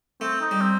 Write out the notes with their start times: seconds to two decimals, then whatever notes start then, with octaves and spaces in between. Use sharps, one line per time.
0.21 A3 C4
0.42 D#4
0.51 G3
0.61 C4